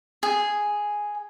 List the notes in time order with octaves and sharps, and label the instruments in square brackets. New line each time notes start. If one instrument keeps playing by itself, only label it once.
[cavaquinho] G#4